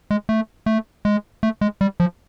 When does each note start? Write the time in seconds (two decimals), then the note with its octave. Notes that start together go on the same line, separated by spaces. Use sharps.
0.11 G#3
0.29 A3
0.66 A3
1.05 G#3
1.43 A3
1.61 G#3
1.81 G3
2.00 F3